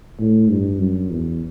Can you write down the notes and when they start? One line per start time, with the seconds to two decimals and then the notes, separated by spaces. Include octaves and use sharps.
0.20 A2
0.50 G2
0.80 F#2
1.11 E2